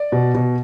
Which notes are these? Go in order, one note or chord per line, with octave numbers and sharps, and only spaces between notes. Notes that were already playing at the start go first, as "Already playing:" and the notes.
Already playing: D5
B2
B2